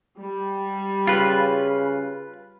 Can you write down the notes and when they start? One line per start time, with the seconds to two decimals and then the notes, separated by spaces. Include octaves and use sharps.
0.18 G3
1.07 C#3 F4 B4